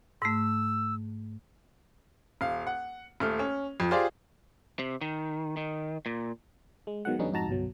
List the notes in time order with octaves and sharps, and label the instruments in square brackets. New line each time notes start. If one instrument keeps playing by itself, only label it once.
[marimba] G#2 A3 [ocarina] E6
[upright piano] D#1 F5
F#5
D#1 A3 F6
C#4
F2
F4 G4 G#4 C5 D5
[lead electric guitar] C3
D#3
D#3
A#2
[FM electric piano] G#3
B2 D#3 F#3 G#3 F#5
F2 D3 G3 B3 C#4 D#4
F2 G#2 D#4 F#4 A5 A#5
G1 C2 B2 F#3